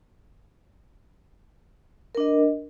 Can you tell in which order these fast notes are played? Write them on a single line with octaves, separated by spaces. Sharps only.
A#4 D4 D#5